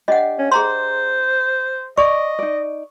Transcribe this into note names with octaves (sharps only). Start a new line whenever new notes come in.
D4 G4 D#5 F#5
C#4
G#4 C5 A#5 C6
D5 D#5 C#6
D#4 D5